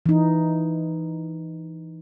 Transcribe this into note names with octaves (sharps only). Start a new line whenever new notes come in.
E3 D#4